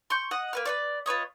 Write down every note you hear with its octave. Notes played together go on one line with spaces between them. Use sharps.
C6 C#6 G6
D#5 F#5
A#3 B4 F6
B4 C#5 D5
F4 B4 C#5 D#5